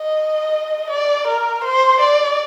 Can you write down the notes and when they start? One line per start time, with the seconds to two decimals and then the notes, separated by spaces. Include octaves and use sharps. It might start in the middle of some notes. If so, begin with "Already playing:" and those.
Already playing: D#5
0.90 D5
1.28 A#4
1.64 C5
2.01 D5